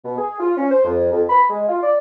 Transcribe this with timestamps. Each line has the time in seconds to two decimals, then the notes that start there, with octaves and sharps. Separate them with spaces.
0.05 B2
0.18 G#4
0.40 F4
0.57 C#4
0.71 C5
0.85 F2
1.13 F2
1.30 B5
1.50 G#3
1.69 F4
1.83 D5